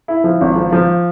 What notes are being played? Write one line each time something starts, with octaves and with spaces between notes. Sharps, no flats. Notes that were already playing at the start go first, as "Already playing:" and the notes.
E4
F3
G#1
F3
F3